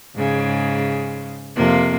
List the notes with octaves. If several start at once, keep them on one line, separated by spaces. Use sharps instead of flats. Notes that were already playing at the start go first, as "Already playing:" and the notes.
G#2 C#3
F2 C3 A#3